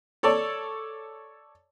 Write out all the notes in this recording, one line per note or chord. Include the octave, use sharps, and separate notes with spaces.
A4 C#5 D5 A5